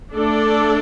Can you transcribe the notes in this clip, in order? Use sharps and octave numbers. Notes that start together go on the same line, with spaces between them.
A3 D4 A4 D5